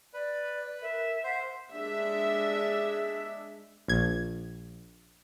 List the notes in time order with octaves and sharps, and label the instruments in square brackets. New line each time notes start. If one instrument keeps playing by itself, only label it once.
[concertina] B4 [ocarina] D5
[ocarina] A#4 [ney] E5
[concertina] C5 [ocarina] F#5
[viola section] G#3 D4 E5
[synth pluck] A#1 G#6